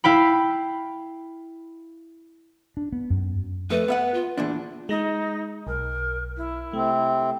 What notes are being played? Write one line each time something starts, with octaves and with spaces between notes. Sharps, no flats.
E4 F5 G5 B5
D4
B3
F#2
F2 A3 B4
B3 E5 F#5
F4
E2 A#2 D4
G#3 D#4 A#6
B1 A#4
E4
C3 A3 C4